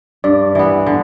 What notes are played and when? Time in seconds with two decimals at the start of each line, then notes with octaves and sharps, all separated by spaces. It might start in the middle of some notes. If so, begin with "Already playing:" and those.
0.24 G2 D5
0.55 E3 B3
0.87 D3